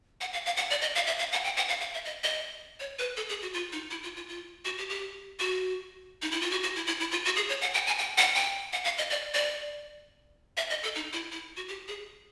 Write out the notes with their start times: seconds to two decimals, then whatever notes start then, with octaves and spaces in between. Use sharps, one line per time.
0.21 F#5
0.33 F5
0.46 F5
0.57 F#5
0.70 D5
0.82 D#5
0.95 F5
1.07 E5
1.19 F5
1.32 F#5
1.45 G5
1.57 F#5
1.69 F5
1.81 F5
1.94 E5
2.05 D#5
2.24 D#5
2.80 C#5
2.99 B4
3.17 A4
3.29 G#4
3.42 F#4
3.54 F4
3.72 D#4
3.91 E4
4.03 F4
4.16 F4
4.29 F4
4.65 F#4
4.78 G4
4.89 G4
5.39 F#4
6.22 D#4
6.31 E4
6.41 F4
6.51 F#4
6.63 F#4
6.76 E4
6.87 E4
7.00 E4
7.11 F4
7.25 F#4
7.36 G#4
7.49 C#5
7.62 F#5
7.74 G5
7.87 G#5
7.99 G5
8.18 F#5
8.35 G5
8.73 F#5
8.84 F5
8.98 D#5
9.10 D5
9.34 D5
10.57 E5
10.70 D#5
10.83 A4
10.95 D#4
11.13 E4
11.32 E4
11.57 F#4
11.68 G4
11.88 G#4